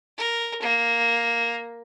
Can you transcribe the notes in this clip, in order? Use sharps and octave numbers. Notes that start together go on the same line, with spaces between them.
A#4
A#3